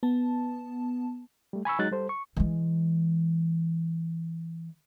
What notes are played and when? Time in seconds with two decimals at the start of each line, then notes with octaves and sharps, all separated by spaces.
0.03 B3 A5
1.53 G3 A3
1.65 G#5 B5 C#6 E6
1.79 F#3 G#3 D#4 F#6 A6
1.91 G3 A4 C5
2.09 C#6
2.37 E3 G#3